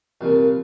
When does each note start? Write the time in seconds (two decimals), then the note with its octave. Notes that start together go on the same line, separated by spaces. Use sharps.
0.21 C2 A#2 F3